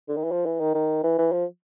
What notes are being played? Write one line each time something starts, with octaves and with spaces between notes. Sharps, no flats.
D3
D#3
E3
F3
E3
D#3
D#3
E3
E3
F3